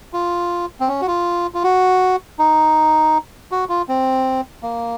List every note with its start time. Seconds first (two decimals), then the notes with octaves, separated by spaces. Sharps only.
0.13 F4
0.80 C4
0.88 C#4
1.01 F#4
1.07 F4
1.54 F4
1.64 F#4
2.39 D#4
3.52 F#4
3.69 F4
3.88 C4
4.63 A#3